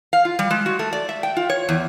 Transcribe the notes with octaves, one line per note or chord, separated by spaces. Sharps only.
F5
F4
G3
G#3
F#4
A3
D5
E5
G5
F4
C#5
E2